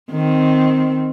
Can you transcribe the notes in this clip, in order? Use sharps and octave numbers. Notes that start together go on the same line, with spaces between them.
D#3 C4